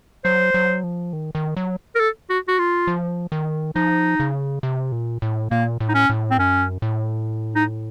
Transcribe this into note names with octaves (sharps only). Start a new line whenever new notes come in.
F#3 C5
F#3
F3
D#3
D#3
F#3
A#4
A4
F#4
F#4
F4
F3
D#3
F3 D#4
C#3
C3
A#2
A2
A#2 A#3
A2
D#4
C#4
A2
C4
F#2 C#4
A2
D#4